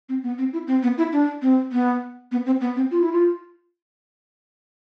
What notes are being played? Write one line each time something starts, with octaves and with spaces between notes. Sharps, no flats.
C4
B3
C4
E4
C4
B3
E4
D4
C4
B3
B3
C4
B3
C4
F4
E4
F4